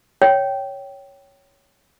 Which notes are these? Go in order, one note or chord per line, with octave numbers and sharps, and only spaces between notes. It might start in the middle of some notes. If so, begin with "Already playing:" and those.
C#5 G5